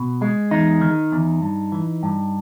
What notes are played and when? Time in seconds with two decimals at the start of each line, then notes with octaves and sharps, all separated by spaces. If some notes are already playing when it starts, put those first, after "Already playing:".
Already playing: B2
0.22 G#3
0.51 E2 D#4
0.81 D#3
1.12 E2
1.42 G2
1.72 E3
2.03 G2